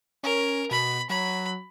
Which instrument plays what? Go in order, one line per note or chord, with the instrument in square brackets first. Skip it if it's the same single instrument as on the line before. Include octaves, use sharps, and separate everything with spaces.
[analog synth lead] C#4 [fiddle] A#4
[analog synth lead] B2 [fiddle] B5
[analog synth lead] F#3 [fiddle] B5